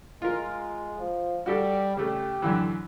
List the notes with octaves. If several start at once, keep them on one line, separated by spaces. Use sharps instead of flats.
G#3 F4 A#4
F3
G3 F#4 G4 A4
C#3 A3 G4
F#2 D3 E3